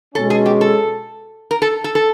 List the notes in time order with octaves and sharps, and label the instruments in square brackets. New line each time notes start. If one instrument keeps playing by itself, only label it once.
[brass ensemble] B2 G#3 C#4 [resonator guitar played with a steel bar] A4
[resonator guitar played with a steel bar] G#4
G4
A4
A#4
A4
A4
A4